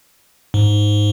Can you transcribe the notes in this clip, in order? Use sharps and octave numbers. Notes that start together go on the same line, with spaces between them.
G#2